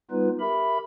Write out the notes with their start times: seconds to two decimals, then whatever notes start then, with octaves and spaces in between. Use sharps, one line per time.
0.11 G3 B3 D#4 F4 B4
0.40 G4 A#4 E5 B5